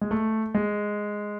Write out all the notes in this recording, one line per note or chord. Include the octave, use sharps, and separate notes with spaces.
G#3
A3
G#3